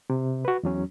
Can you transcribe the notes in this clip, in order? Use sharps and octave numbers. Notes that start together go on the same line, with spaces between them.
C3
F#4 B4
E2 F#3 C#4